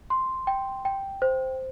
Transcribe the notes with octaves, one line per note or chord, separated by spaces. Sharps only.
C6
G5
G5
C5